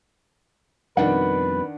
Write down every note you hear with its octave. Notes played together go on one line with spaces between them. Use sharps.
F2 B2 D#3 G3 D4 B4 F#5